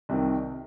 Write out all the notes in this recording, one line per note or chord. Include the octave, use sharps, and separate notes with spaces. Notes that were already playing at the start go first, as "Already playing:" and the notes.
C2 C3 D#3